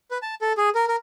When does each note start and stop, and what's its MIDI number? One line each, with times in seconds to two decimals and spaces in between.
0.11 0.18 71
0.22 0.35 81
0.41 0.53 69
0.58 0.69 68
0.75 0.85 70
0.88 0.96 70